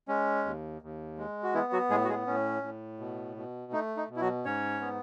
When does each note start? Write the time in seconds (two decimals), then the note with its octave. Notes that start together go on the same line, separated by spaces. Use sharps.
0.08 G#3 C#4
0.45 D#2
0.82 D#2
1.18 G#3
1.43 F#4
1.54 E3 B3 E4
1.73 F#3 F#4
1.90 A2 G#3 G#4
2.05 F#4
2.09 G#3 G#4
2.27 A2 C#4
2.63 A2
3.00 B2
3.37 B2
3.73 A3 D#4
3.97 D#4
4.09 B2
4.16 E4
4.21 F#3 F#4
4.45 G#2 C#4 C#5
4.81 B3